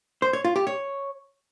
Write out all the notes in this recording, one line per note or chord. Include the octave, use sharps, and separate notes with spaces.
C5
C#5
F4
G4
C#5